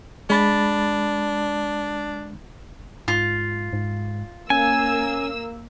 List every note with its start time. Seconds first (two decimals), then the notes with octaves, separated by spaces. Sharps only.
0.30 G#3 D4 B5 A6
3.08 G#2 F4
3.73 G#2
4.50 A#3 C#4 G#5 E6